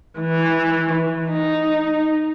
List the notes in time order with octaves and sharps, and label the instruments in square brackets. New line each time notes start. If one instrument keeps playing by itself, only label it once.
[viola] E3
D#4